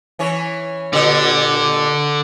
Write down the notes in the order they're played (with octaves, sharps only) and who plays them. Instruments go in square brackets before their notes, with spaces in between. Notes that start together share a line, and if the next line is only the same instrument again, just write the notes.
[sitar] E3 C#4 C#5
[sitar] A#2 G4 [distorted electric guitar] D3